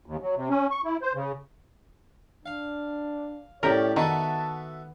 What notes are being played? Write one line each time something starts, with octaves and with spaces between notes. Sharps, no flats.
D#2
F#3
C3
C#4
C#6
E4
C5
C#3
D4 F5
A2 A3 C#4 G4 A#4 C#5 D5
D#3 B3 F#4 A4 E5 A5